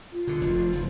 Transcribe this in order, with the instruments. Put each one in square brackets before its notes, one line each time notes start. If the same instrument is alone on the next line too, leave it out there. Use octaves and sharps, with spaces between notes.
[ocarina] F4
[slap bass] B2 D3
F1 F2
F1